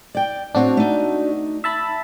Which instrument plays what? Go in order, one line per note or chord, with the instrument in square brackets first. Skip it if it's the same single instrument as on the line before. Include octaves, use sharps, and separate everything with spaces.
[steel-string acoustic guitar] D5 G5
[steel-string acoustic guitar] A2 C4 C#5 [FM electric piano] D4 F#4
[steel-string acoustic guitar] A3 D#4
[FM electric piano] E5 A5 B5